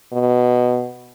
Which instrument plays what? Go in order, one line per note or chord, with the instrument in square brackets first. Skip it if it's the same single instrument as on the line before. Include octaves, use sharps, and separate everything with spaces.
[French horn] B2